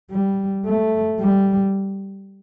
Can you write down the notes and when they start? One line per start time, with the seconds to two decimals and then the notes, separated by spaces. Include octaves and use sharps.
0.11 G3
0.66 A3
1.20 G3